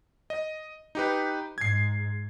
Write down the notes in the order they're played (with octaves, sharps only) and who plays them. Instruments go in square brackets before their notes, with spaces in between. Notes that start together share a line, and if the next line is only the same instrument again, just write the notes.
[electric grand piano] D#5
D#4 G4 B4
[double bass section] G#2 [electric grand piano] G#6 C7